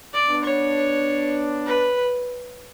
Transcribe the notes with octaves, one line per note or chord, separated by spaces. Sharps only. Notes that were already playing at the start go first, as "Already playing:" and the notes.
D5
B3 D4
C#5
B4